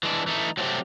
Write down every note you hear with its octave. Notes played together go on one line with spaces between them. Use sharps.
E3 G#3 D4
E3 A3 D#4
F#3 A3 A#3 C4 G4